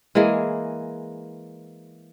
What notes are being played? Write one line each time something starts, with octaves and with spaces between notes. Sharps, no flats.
E3 G#3 A#3 G#4